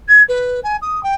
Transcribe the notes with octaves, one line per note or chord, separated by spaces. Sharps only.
G#6
B4
G#5
D#6
G5